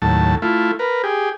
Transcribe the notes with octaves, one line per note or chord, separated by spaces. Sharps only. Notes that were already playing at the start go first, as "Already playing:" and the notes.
D#2 A2 F#3 A5
A3 E4 F4
A#4 B4
G4 G#4